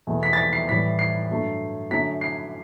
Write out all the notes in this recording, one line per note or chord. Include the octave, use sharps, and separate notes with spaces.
E2 B2 A3
B6
A6
B6
C7
A2 E3 G3 B6
C7
G2 F#3 A3
F#2 D3 F#3 A3 B6
C7